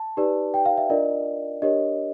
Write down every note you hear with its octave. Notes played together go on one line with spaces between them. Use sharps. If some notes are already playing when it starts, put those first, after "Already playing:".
Already playing: A5
D#4 G4 B4 D5
G5
F5
E5
D4 F4 A#4 D5 D#5
D4 G4 A#4 C#5 D#5